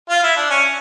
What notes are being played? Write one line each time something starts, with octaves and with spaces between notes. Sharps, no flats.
F4
E4
D4
C#4